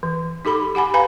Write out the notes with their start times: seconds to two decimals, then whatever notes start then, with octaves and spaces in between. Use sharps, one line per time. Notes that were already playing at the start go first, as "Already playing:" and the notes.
0.03 E3
0.45 D#4 G4 A4 B5 D6
0.75 G4 F#5 G#5 B5
0.94 B4 F5 G#5 A#5 B5